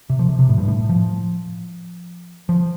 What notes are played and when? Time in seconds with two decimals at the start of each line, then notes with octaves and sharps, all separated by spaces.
0.10 C3
0.19 F3
0.29 C3
0.39 C3
0.49 A2
0.58 G2
0.68 A2
0.89 F3
2.49 F3